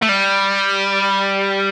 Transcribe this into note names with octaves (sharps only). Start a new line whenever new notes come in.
A3
G3